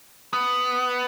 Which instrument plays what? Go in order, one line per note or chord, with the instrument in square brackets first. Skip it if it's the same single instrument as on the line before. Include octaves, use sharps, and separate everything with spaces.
[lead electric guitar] B3